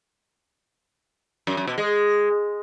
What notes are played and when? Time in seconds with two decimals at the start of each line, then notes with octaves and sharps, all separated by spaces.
1.47 F#2
1.57 F#2
1.67 B2
1.78 G#3